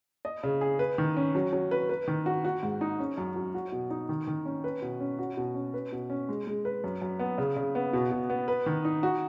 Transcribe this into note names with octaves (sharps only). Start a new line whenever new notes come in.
D#5
C#3
G#4
B4
D#3
C#4
F#3
F#3
B4
B4
D#3
F#4
F#4
G#2
D#4
C#4
F#2
F#3
F#4
B2
D#4
D#3
D#3
C#4
B4
B2
C#4
F#4
B2
C#4
B4
B2
C#4
G#3
G#3
B4
F#2
F#2
B3
C#3
C#3
B3
B2
B2
B3
B4
D#3
D#4
F#4